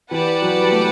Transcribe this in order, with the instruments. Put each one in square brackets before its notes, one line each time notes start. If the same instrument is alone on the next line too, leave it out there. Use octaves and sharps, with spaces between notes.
[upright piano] E3 [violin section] G4 B4 D5 F#5 A5
[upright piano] F#3
G3
A3